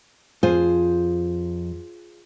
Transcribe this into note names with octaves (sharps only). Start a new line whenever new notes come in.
F2 F4 G#4 C5